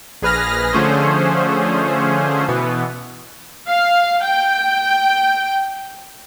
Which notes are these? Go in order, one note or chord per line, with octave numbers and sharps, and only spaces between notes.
A#1 G#4 B4 F6 A#6
D3 F3 A3 C#4 G#4 C5
B2 E3 B3
F5
G5